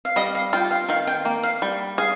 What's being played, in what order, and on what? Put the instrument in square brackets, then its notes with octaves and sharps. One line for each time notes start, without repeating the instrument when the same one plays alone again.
[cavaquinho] F5
[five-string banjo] G3 [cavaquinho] D#5
[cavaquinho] F5
[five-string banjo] F4 [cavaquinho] G5
[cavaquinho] F5
[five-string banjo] D#3 [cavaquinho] F5
[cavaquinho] G5
[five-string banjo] A#3
[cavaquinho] F5
[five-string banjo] G3
[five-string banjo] G#4 [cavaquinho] F5